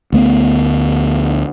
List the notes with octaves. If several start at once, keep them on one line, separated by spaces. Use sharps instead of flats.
D2 A3 B3